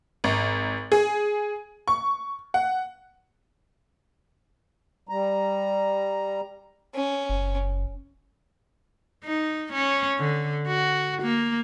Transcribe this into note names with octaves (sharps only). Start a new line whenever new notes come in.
G#1
G#4
C#6
F#5
G3 A#5
C#4
F#1
D#4
C#4
D3
F#4
A#3